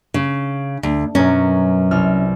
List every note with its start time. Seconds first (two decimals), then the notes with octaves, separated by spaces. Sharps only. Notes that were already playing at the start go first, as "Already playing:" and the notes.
0.14 C#3
0.83 D2
1.15 F#2 B2 C#4 A#4
1.91 C2 F6